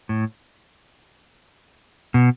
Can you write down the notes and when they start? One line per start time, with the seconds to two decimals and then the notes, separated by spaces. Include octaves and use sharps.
0.09 A2
2.14 B2